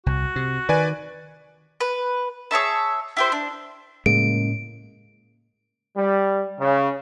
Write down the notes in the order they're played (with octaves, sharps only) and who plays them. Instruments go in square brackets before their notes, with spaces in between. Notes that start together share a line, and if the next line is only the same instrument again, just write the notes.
[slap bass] C2 [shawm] F#4
[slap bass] C3
[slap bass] D#3 [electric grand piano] B4 D5 G#5
[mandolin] B4
G#4 C#5 E5 A5
E4 G4 C5
D4
[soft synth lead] A2 [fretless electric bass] C#3 G#3 A#3 [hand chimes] D7
[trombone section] G3
C#3